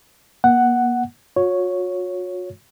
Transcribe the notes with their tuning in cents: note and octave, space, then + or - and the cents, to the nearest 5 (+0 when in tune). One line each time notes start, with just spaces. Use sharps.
A#3 +40 F#5 +5
F#4 -45 C#5 +0